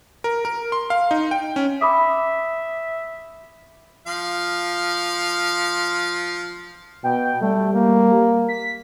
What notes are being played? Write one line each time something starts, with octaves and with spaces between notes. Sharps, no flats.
A#4
A#4
C6
F5
D#4
G5
C#4
E5 B5 D6 D#6
F3 F5
B2 G5
G3 A3
A#3
B6